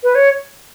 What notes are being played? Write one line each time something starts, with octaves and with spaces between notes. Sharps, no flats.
B4
C#5